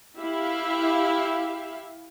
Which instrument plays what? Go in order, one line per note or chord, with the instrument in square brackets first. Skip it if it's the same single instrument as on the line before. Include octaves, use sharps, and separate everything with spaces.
[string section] E4 G4 E5 F5